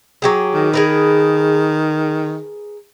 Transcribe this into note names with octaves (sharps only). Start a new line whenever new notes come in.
F#3 G4 G#4
D#3
G#4 A#4 B4